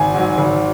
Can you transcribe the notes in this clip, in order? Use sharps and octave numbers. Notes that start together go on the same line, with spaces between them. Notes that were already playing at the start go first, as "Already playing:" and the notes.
Already playing: G#1 G#5
G#2 F#3
G#1